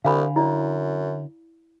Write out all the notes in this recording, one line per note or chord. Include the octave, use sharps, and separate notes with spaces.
C2 D3 F5 G#5 B5
F#2 E4 D5